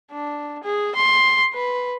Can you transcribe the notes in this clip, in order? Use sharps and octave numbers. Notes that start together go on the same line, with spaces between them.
D4
G#4
C6
B4